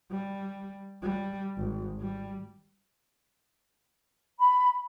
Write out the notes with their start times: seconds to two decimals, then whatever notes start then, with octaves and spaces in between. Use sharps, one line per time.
0.10 G3
1.02 G3
1.57 G#1
2.01 G3
4.39 B5